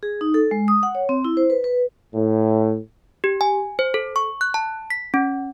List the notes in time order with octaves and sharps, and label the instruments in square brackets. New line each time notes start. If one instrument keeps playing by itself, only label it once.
[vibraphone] G#4
D#4
A4
G#3
D#6
F#5
C#5
C4
E4
C5
B4
B4
[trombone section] A2
[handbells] G4
G#5
C5
A4
C#6
F#6
A5
B6
C#4